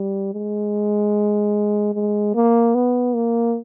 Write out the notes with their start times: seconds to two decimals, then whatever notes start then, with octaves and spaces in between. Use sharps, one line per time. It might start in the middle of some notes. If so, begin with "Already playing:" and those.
Already playing: G3
0.33 G#3
1.94 G#3
2.35 A#3
2.75 B3
3.15 A#3